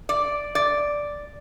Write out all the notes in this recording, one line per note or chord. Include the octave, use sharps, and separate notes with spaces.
D5
D5